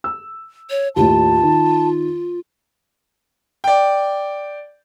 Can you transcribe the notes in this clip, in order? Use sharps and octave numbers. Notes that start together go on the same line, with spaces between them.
E6
C#5
D#2 A2 F4 A5
D#3
D5 G5